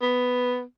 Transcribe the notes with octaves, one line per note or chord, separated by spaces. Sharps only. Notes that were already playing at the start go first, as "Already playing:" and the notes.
B3